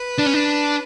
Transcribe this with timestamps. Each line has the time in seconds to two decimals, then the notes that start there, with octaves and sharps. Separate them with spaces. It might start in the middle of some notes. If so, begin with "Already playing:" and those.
Already playing: B4
0.19 D4
0.27 C#4
0.34 D4